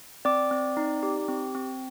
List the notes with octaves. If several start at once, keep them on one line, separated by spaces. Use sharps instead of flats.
C4 D5 D6
C4
D#4
G4
C4
C4